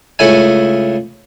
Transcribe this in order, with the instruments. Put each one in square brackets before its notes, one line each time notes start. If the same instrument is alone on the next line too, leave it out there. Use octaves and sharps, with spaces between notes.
[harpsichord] C#2 A3 C#4 E4 G#5